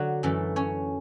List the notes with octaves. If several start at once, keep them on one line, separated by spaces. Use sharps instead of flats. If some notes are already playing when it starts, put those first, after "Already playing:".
Already playing: D3 F#3 F#4
F#2 E3 A3 A4
C#4 C#5